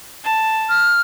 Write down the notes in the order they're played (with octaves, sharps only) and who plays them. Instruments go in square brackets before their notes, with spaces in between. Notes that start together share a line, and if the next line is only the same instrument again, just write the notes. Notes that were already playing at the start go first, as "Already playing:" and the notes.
[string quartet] A5
[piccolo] F6